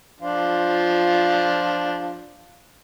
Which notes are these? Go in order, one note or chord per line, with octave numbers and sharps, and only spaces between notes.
F3 D4 F4